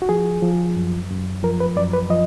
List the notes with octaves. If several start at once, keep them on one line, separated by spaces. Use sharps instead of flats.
F#4
F3 G#4
F3
F#2
F#2
F3 A#4
B4
F#2 D5
B4
F3 D#5